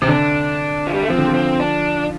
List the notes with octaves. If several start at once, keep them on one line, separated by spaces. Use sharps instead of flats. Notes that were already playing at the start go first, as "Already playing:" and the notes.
C3 C4
D3 D4
F3
G3
A3
F3 C4
D3
F3
C4
D4